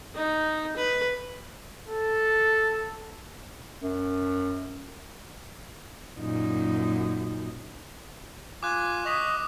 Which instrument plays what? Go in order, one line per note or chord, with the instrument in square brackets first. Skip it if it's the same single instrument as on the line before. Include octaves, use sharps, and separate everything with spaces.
[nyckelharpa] D#4
B4
[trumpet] A4
[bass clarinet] F#2
[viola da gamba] F#2 A#2 D#4
[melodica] F4 G#5 [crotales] D6 F#6
[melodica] D#5 [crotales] C#6 D#6 B6